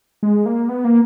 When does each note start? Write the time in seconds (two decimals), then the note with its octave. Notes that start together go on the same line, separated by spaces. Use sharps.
0.23 G#3
0.46 A#3
0.69 B3
0.85 A#3